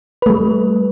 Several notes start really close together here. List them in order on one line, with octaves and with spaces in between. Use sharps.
B4 A3 G3